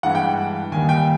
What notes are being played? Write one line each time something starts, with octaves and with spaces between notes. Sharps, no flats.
G2 E3 G#3 F#5
G5
D#2 D#3 G3 G#5
G5